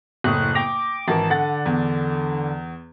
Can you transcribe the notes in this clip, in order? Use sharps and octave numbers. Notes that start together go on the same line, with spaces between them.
F#1 A2 D#6 F#6
G5 D6 A#6 F7
G#1 E3 A#4 A5
D3 F#5 A6
E2